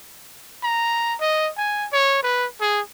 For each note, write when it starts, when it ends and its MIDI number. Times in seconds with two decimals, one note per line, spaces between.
0.63 1.16 82
1.20 1.50 75
1.57 1.87 80
1.92 2.23 73
2.23 2.46 71
2.60 2.81 68